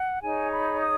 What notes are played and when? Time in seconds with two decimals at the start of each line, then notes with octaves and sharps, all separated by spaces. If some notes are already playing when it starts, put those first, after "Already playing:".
Already playing: F#5
0.23 D#4 G#4 C#5 G#5
0.52 B5
0.81 D#6